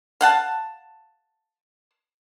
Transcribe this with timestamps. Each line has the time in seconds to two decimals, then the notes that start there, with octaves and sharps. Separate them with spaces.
0.21 F5 F#5 A5